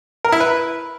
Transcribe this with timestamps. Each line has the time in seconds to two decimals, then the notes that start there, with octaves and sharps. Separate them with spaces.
0.24 A#4
0.32 E4
0.40 B4